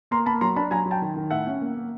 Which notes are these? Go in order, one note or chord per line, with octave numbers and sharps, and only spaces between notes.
A#3 A#5 C6
A#3 A5 B5
F#3 A#5 C6
D4 A5 B5
F#3 G#5 A#5
F#3
G5 A5
D#3
D#3
A2 E5 F#5
C#4
A#3
A#3